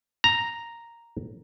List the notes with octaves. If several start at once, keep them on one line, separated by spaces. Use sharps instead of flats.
A#5